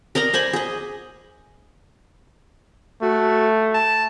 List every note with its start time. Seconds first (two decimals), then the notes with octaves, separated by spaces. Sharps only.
0.15 A#4 D5 D#5 A#5
0.34 C5 D5 G#5 B5
0.53 G#4 D#5
3.02 A3 F#4
3.74 A5